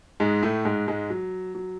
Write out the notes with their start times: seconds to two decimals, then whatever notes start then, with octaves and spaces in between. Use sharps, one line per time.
0.20 G#2 G#3
0.43 A2 A3
0.65 G#2 G#3
0.88 G#2 G#3
1.10 F#3
1.55 F#3